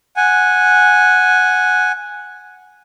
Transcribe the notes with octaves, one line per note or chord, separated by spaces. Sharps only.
F#5 G#5